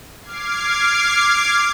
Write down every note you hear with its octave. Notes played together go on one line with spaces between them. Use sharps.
D6 F6 G#6 C7